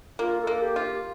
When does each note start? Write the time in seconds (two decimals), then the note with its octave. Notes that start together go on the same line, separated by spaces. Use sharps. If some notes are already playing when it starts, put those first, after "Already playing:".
0.19 A#3 F4
0.41 A4
0.47 A#3
0.62 G4
0.76 F4